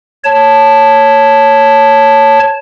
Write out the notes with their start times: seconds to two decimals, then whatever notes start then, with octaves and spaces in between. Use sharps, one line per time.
0.24 C#5 A5